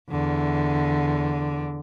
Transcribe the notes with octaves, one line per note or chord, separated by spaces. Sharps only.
E2 D3